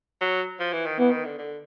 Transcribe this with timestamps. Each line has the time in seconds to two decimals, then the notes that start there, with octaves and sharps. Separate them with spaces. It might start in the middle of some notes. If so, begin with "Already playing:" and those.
0.21 F#3
0.60 F3
0.73 E3
0.86 D#3
0.99 E3 B3
1.11 D#3
1.25 D3
1.38 D3